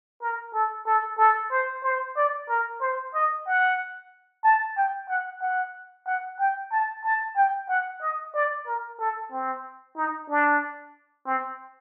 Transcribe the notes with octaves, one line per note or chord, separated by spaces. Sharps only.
A#4
A4
A4
A4
C5
C5
D5
A#4
C5
D#5
F#5
A5
G5
F#5
F#5
F#5
G5
A5
A5
G5
F#5
D#5
D5
A#4
A4
C4
D#4
D4
C4